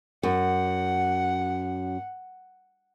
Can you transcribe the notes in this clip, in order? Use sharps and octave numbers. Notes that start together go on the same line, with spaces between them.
F#2 F#5